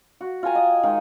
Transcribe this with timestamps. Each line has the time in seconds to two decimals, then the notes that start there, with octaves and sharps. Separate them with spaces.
0.21 F#4
0.43 F4 G5 G#5 A#5
0.55 D#5
0.83 D#3 G#3 D#4 F4